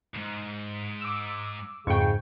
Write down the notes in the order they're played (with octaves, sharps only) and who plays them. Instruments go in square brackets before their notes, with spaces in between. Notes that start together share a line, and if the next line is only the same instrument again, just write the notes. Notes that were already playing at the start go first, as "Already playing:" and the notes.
[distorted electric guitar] D2 G#2
[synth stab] D6 E6
[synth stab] F2 C#6 [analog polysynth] G#2 G5 [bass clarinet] C#3